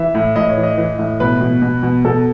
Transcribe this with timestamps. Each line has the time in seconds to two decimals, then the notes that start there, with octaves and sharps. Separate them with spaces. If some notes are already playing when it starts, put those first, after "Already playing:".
Already playing: E3 E5
0.15 A2
0.36 A2 D#5
0.49 C#5
0.57 E3
0.63 D#5
0.77 E3
0.99 A2
1.20 B2 B4
1.41 B2
1.62 B2
1.83 B2
2.05 B2 A4